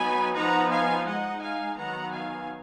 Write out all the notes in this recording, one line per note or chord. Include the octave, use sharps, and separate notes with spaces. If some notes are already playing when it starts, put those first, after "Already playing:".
Already playing: F#3 B3 D#4 G#5 B5
F3 B3 D#4 F#5 A#5
F5 G#5
G#3 D#4 D#5 F#5
F5 G#5
D#3 F#3 B3 F#5 A#5
F5 G#5